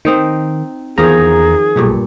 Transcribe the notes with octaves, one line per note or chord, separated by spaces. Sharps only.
D#3 C4 D#4 C5
E2 D#3 F3 G#4 A#5
B1 G2 A#2 A3